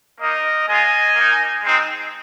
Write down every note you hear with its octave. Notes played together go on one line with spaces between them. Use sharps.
A#3 D#4 A#4 D#5
G#3 F4 D#5 G#5
A#3 D#4
G#3 C4 D#4